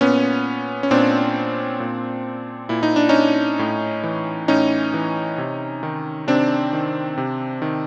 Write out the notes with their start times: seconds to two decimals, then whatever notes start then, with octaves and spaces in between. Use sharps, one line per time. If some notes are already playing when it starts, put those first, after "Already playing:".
0.01 A#2 B3 C#4
0.83 C#4
0.91 A#2 C4 D4
1.80 A#2
2.69 A#2 E4
2.83 D#4
2.96 D4
3.09 C#4 D#4
3.59 A2
4.04 E3
4.48 A2 C#4 D#4
4.94 E3
5.38 C3
5.83 D#3
6.27 C3 C4 D4
6.73 D#3
7.18 C3
7.62 D#3